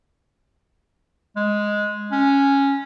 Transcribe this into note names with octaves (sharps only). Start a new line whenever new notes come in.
G#3
C#4